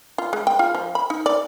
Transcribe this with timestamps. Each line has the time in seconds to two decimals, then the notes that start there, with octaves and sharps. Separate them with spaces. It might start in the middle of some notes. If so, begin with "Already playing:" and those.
0.18 F4
0.33 G#3
0.47 G5
0.59 F4
0.75 F3
0.95 B5
1.10 D#4
1.26 D5